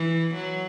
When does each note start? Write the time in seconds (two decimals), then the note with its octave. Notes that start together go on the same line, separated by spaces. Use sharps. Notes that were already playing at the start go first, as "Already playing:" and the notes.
Already playing: E3
0.34 F#3